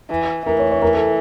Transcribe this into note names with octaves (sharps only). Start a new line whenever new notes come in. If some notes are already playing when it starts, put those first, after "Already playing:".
E3
E3 A#4
C#5
C#5
A#4
A4